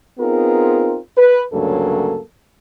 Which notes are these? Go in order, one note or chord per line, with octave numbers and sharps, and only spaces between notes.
B3 C4 D#4 F4 G#4 A#4
B4
D2 G2 C#3 F#3 A#3 A4